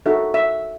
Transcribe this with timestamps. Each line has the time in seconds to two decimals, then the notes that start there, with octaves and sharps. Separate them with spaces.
0.06 D#4 F#4 A4 E5
0.34 E5